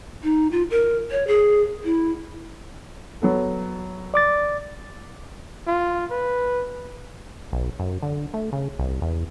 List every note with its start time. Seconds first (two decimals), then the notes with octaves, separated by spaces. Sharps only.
0.23 D#4
0.52 F4
0.71 A#4
1.11 C#5
1.28 G#4
1.84 E4
3.22 F#3 B3 A4
4.14 D5 D6 A6
5.67 F4
6.11 B4
7.53 B1
7.79 F#2
8.02 D3
8.34 A3
8.53 C#3
8.79 C2
9.02 E2